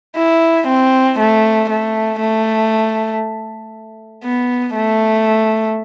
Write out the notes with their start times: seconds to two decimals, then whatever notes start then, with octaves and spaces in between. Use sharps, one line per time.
0.16 E4
0.68 C4
1.19 A3
1.70 A3
2.20 A3
4.24 B3
4.76 A3